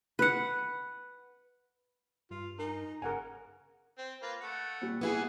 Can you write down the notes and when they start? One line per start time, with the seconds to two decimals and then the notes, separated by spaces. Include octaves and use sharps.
0.19 B4 F#5
2.31 G2 F4
2.59 D#4 A#4 G#5
3.02 G1 C#3 A#4 F#5 G#5
3.98 C4
4.22 A#3 F4 B4
4.41 A3 F#5
4.82 A#2 G3
5.01 E3 B3 E4 G#4